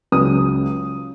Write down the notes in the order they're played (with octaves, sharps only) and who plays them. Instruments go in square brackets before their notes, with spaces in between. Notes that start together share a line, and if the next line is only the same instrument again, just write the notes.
[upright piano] C#2 C#3 F#3 C#4 D#6